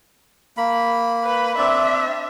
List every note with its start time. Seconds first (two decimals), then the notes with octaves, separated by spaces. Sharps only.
0.57 A#3 B5
1.24 B4
1.58 C4 D4 D5 E5